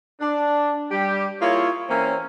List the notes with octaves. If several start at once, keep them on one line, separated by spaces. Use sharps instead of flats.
D4
G3 G4
A#3 E4 F4 G#4 C#5
E3 A#3 C4 C#4